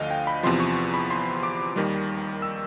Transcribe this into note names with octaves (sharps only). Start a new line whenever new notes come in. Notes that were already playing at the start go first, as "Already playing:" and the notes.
Already playing: D2 D3 F3 D#5 F5
G5
B5
E2 C3 F3 C6
C#6
B5
C6
D6
D#2 D#3 G3
E6